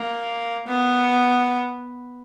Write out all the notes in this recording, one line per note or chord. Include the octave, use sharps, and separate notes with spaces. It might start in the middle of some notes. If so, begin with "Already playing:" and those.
Already playing: A#3
B3